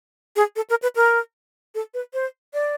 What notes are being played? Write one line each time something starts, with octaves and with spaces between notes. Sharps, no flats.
G#4
A4
A#4
B4
A#4
A4
B4
C5
D5